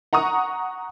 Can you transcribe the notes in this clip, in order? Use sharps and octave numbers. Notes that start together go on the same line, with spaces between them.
F#5 A#5 C#6 D#6